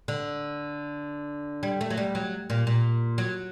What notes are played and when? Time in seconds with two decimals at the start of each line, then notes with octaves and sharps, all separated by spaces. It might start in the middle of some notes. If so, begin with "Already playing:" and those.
0.08 D3
1.63 G3
1.81 A3
1.90 F#3
1.97 G3
2.15 F#3
2.50 A#2
2.67 A#2
3.18 F#3